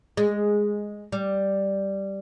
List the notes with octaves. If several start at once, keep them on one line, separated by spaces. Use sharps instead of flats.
G#3
G3